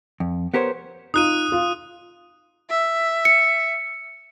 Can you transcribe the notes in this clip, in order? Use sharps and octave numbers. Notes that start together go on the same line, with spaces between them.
F2
B3 G4 A#4 C5 C#5
D#4 F4 D#6 F#6 D#7
F4
E5
C#7